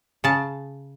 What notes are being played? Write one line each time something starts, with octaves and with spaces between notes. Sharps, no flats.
C#3 A5